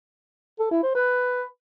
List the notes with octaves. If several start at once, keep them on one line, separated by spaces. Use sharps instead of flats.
A4
E4
C5
B4